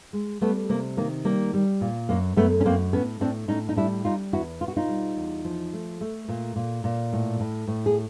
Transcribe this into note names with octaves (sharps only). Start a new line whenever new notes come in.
G#3
G3 A3 B3
C3 A#3
D#3 A#3
G3 A#3
G3
A#2
F#2 A#3
F#2 A3 B3
C#4
F#2 A#3 C4
A2 B3 C#4
A2 C4 D4
A2 C#4 D#4
D#4
G3 D4 E4
G3 D#4 F4
E2 E4 F#4
B2 F4
F#4
D#4 F4
G3
E2
F3
A3
A3
A#2
A#2
A#2
A2
A2
A2
G#4